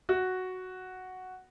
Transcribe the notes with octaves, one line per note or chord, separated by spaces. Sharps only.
F#4